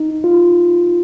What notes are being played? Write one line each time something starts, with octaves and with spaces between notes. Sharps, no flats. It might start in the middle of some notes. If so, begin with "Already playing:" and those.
Already playing: D#4
F4